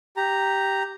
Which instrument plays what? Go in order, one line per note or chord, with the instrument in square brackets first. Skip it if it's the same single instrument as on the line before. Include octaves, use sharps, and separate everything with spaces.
[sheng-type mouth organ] G4 A#5